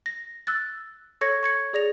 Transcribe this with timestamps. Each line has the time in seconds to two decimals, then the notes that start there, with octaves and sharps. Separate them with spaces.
0.06 A#6
0.47 E6 F#6 A6
1.21 A4 C#5 C#6 G#6 A#6 C#7
1.43 C#6 G#6 C#7
1.73 G#4 D5 A#6 F7